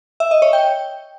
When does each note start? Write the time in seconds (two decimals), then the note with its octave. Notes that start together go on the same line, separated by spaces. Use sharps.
0.20 E5
0.31 D#5
0.42 C#5
0.53 G5